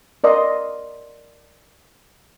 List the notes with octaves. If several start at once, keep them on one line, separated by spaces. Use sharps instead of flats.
A#4 D5 D#5 C6